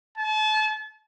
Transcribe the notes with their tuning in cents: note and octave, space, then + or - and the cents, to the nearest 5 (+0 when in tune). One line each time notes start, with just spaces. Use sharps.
A5 -35